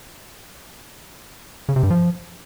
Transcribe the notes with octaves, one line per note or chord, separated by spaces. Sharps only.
C#3
C3
G2
F3